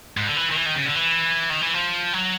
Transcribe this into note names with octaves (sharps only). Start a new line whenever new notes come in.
G#2
D3
E3
D#3
E3
D#3
C#3
D3
E3
D#3
E3
F3
F#3